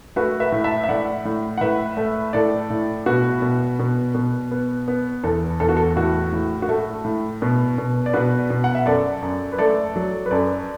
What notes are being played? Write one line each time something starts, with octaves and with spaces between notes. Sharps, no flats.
A3 F#4 B4
B4 E5
A2
E5 A5
E5
A2 D5 F#5
A2
F#5
A2 B4 E5
A3
A2 A4 D5
A2
B2 F#4 B4
B2
B2
B2
B3
B3
E2 A4
E2 A4
F#4
A4
A2 F#4
A2
F#4
A3 A4
A2
B2
B2
D5
B2 F#4 B4
B2
F#5
E5
F#2 A4 D5
F#2
B4
A3 A4 D5
F#3
B4
F#2 A4 D5